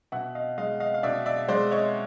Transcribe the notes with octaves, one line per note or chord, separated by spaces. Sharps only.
B2 E5 F#5
D#5 F5
G#3 D#5 F5
D#5 F5
F5
B2 D5 E5
D5 E5
G#3 C5 D5
C#5 D#5